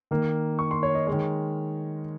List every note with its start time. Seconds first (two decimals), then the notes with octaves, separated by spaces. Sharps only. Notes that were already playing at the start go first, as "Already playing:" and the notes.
0.11 D#3 A#3
0.59 C#6
0.71 C6
0.83 C#5
0.95 D#5
1.07 G#3 C#5
1.12 D#3